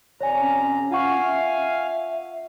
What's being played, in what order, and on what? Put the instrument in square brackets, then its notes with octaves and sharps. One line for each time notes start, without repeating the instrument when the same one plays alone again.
[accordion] F2 C3 A#5 [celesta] C#5 D5 G#5
[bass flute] C#4
[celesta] F4 F#5 C#6 [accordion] F5 G#5
[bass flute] E5